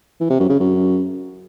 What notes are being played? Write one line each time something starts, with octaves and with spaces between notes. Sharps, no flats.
E3
C3
F#2
C#3
F#2